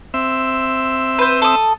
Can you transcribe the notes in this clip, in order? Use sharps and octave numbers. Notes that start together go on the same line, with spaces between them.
C4 E5
B4 C5
A4 D#6